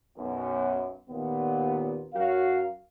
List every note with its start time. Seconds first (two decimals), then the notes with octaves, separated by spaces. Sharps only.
0.17 B1 F#2
1.10 D#2 A#2 B3
2.14 F#2 F#3 F#4 A#4 F5